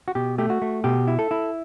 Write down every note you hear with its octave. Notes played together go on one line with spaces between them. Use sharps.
F#4
B2 G4
A3 G4
F#4
A3
B2 G4
E4
A4
E4